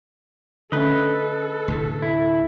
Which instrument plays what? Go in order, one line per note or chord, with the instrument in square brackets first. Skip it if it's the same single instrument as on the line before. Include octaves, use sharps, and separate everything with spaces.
[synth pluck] D3 A3 C#4 [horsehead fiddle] A4 [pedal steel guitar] B4 D#5
[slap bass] D2 A2 C3
[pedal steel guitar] E4